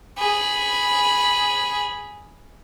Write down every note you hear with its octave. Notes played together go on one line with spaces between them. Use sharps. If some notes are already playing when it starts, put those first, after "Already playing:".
G#4 B5